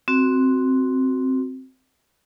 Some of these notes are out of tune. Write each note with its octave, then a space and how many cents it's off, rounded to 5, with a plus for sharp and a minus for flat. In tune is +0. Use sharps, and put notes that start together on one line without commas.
C4 +0 F#4 +0